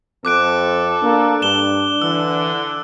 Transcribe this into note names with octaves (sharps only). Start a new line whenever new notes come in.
F2 C4 A4 D6 F#6 D7
A#3 D4
G2 E7 G7
D3 E3 E6